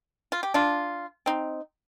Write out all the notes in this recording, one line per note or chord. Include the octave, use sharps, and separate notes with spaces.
F4
G4
D4 F4
C4 D#4